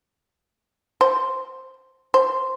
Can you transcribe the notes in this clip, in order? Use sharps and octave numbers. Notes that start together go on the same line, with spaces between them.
C5
C5